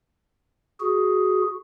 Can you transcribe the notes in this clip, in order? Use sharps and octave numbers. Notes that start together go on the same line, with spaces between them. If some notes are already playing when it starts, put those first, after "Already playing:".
F#4 G#4